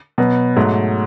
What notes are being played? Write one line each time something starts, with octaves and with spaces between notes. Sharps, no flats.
B2 F#3 B3
G#2 F#3 A3